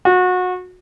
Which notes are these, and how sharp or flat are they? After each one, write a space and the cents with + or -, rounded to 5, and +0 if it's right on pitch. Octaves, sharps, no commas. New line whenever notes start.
F#4 -25